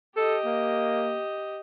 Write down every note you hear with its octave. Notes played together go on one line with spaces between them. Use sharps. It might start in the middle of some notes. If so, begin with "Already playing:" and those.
G4 A4 D#5
A#3